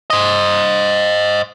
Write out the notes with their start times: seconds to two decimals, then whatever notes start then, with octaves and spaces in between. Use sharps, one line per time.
0.10 C5 D#5